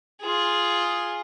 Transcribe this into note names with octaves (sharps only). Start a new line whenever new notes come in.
F4 G#4